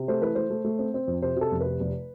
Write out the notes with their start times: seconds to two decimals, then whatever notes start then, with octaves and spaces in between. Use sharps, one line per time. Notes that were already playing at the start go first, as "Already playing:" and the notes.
Already playing: C3
0.08 A3 C5
0.22 E3 B4
0.35 A3 C5
0.50 A3
0.64 A3
0.79 C4
0.94 C4
1.07 F2
1.22 C3 C5
1.36 C3 A4
1.52 F1
1.60 C3 B4
1.80 F1